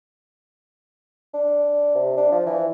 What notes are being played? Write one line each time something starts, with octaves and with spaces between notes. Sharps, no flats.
D4
C3
D4
F3
E3